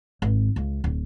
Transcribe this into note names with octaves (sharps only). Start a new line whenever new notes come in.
G#1
C#2
D1